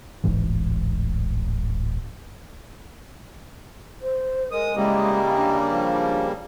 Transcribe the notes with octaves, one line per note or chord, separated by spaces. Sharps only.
D1 A1 G#2 E3
C5
G#3 A#4 D#6
C#3 G3 G#3 A#3 E4 G4 D#5
D4
F3